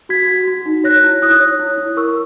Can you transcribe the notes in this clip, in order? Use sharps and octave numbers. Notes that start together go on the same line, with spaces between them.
F#4 G#6 B6
F#4
F#4
D#4
C#5 F#6 A#6
E4
E4 D#6 F#6
C#5
E4
E4
A#4 C#6 E6